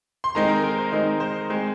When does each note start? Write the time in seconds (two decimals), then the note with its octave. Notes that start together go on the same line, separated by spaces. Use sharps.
0.24 C6
0.35 D#3 G#3 C4 D#4 A#5
0.49 A#4
0.64 A#4
0.78 C5
0.92 D#3 G#3 C4 D#4 D#5
1.20 C5
1.49 G#3 C4